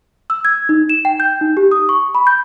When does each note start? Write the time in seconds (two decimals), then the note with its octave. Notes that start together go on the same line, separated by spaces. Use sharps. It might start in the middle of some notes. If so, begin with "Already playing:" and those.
0.30 E6
0.45 G#6
0.69 D#4
0.89 E7
1.05 G5
1.20 G6
1.41 D#4
1.57 G4
1.71 D#6
1.89 C#6
2.14 B5
2.27 G6